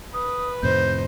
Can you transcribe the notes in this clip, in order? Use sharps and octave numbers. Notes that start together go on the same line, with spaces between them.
B4 D#6
F2 A2 C3 D#4 C5 G6